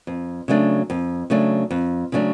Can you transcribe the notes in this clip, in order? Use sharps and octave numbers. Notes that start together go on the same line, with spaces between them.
F2
C#3 F#3 A3 D4
F2
C#3 F#3 A3 D4
F2
C#3 F#3 A3 D4